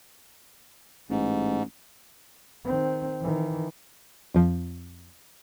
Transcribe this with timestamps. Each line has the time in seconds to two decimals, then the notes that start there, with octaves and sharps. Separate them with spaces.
1.10 A1 G#2
2.65 D#3 C4
3.22 D#3 E3
4.34 F2 F3